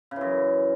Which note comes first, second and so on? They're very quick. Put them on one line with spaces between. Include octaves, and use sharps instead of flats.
C#3 E3 F#2